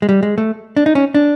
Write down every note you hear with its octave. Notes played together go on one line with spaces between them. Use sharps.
G#3
G3
G#3
A3
D4
D#4
C#4
D4